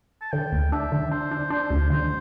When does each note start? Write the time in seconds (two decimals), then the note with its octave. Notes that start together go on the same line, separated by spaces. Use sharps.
0.21 A5
0.32 D3 G5
0.52 D2
0.72 D4 E5
0.92 D3
1.11 D4 C5
1.31 D4
1.50 D4 C5
1.70 D2
1.90 D3 C5